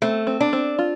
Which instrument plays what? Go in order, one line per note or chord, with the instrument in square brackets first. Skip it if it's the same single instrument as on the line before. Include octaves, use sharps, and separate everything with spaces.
[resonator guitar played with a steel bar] A3 [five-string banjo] C4
[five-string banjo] C4
[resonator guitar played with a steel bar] D4
[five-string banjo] C4
F4